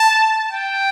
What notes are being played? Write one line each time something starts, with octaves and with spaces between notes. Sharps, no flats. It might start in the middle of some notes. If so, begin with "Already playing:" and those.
Already playing: A5
G5